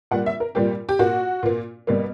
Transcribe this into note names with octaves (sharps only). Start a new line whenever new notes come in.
A#2 G3 A#3 F#5
E5
A#4
A#2 G3 A#3 G4
G4
A#2 A#3 F#4
A#2 A#3
B2 G3 A#3